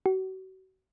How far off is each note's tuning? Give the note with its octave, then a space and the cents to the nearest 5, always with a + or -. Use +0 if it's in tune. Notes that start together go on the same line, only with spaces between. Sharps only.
F#4 +35